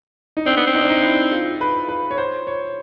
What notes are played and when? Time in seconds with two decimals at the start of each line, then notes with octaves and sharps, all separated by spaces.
0.37 D#4
0.46 C4 D4
0.57 B3
0.67 C4
0.75 D#4
0.83 D4
0.90 D#4
1.03 E4
1.32 F4
1.61 B4
1.89 B4
2.11 C#5
2.18 C5
2.47 C#5